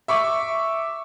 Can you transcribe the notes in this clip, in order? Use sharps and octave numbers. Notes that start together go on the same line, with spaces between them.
E5 C#6 D6